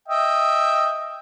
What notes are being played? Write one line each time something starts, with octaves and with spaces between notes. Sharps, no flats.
D#5 E5 G5